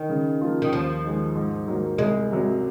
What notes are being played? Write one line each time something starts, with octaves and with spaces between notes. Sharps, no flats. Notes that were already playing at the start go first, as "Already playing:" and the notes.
Already playing: D#3
C#3
F3 A#3 F4
D#3
D#2 F3
D#3 G#3 D#4
G#2
D#3 F#3 A#3
C2 G#3
C3 F#3